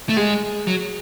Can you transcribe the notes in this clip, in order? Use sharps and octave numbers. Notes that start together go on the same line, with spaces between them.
A3
G#3 G#4
F#3